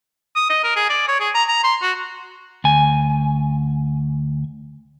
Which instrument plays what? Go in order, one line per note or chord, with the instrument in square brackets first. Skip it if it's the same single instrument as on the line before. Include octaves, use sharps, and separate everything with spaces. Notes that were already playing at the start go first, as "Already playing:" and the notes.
[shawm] D#6
D#5
A#4
G#4
D5
C#5
G#4
A#5
A#5
C6
F#4
[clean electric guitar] D2 G#5